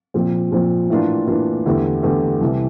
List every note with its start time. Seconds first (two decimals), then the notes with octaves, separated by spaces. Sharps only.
0.14 A#2 F3 C4
0.52 A#2 F3 C4
0.90 A2 E3 A#3 D4 F4
1.28 A2 E3 A#3 D4 F4
1.65 E2 D3 A3 E4 G4
2.03 E2 D3 A3 E4 G4
2.41 C2 C3 E3